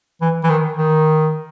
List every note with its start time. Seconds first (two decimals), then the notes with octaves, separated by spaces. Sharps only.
0.21 E3
0.44 E3
0.49 D#3
0.77 D#3